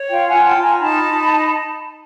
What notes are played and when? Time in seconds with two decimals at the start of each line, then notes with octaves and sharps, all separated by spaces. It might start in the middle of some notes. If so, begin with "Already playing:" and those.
Already playing: C#5
0.09 F4 F5 G5
0.27 F#5 G#5
0.33 F4
0.45 G5 A5
0.56 F4
0.62 G#5 A#5
0.79 D#4 A5 B5
1.02 D#4